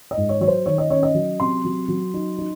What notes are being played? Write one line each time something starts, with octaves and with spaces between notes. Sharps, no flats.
D#5
G#2
C#5
F#3 C#5
C5
D#3 C#5
D#5
C#4 C#5
D#5
F#3
C3 C6
F#3
F#3
D#4
D#4